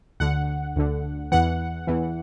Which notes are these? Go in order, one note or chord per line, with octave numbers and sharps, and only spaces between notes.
D2 D3 F#5
D2 D3
E2 E3 F#5
E2 E3